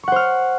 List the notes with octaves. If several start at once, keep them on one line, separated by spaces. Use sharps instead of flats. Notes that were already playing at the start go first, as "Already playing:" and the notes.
C5 F#5 C#6 F6